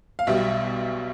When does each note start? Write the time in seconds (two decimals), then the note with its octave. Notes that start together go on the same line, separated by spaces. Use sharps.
0.19 F5
0.27 B1 B2 G3 E5